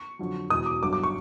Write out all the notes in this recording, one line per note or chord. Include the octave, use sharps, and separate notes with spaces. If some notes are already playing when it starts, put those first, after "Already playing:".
Already playing: C#6
F2 D3 F#3
E1 E2 B2 D#6
D6
G1 G2 D3 F#3 D6
D6
C#6